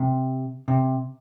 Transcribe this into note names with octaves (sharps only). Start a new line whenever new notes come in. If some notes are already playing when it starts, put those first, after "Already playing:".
Already playing: C3
C3